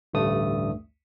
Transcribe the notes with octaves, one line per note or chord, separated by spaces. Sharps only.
A1 D2 G2 A3 D#6